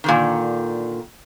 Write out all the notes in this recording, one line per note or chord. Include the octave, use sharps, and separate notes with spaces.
A#2 D3 D#3